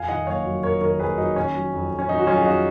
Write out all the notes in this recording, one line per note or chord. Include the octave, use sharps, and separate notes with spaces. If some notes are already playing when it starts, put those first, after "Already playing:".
Already playing: F2 F5 G#5
D#3 D#5 F#5
F#1 C#5 F5
F#3
F2 A#4 C#5
D#3 A#4 C#5
F#1 G#4 B4
F#3 D#4
D#3 C#4
F#3
F2
F2
C#4
D#3 D#4
F#4
F#3 C#4 F4
G#4
F2 D#4 F#4